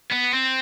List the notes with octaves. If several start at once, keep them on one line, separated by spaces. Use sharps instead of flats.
B3
C4